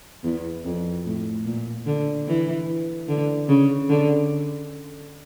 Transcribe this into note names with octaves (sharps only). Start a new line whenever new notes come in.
E2
F2
A2
A#2
D3
E3
D3
C#3
D3